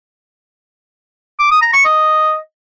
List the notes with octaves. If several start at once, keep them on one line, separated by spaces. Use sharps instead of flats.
D6
D#6
A#5
C#6
D#5